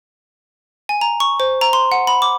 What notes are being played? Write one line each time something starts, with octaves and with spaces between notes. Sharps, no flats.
G#5
A#5
C#6
C5
A#5
C6
F#5
B5
D6